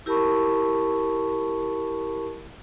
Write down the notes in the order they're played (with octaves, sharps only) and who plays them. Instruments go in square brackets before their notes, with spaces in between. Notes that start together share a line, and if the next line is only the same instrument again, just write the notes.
[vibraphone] E4 G4 A#4 A5 B5 C#6